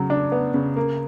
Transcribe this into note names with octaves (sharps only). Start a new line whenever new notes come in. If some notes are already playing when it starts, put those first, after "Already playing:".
Already playing: C#3 F#3
D4
B3
C#3
A#3